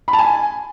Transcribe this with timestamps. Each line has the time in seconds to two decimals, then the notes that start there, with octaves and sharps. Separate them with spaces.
0.08 B5
0.13 A5
0.19 G#5